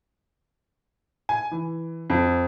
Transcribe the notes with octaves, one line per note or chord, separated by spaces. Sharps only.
G#5
E3
F2